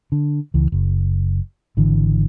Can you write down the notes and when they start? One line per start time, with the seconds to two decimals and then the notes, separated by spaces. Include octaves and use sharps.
0.12 D3
0.54 C#2 E3
0.72 F#1
1.77 G#1 D3 E3